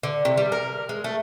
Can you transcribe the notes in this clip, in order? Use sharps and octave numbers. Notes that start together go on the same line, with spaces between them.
D3
C3
G3
A#4
G#3
A3